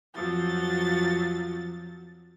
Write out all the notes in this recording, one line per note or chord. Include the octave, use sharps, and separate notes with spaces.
F2 F3 F#3 A6